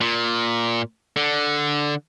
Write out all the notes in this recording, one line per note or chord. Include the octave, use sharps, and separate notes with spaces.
A#2
D3